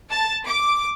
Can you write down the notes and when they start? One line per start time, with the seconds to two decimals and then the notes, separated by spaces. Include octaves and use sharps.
0.10 A5
0.46 D6